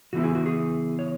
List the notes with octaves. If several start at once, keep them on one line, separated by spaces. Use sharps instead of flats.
C#3 E3 B3 E4 F#4
G#4
F#4
G#4
C#5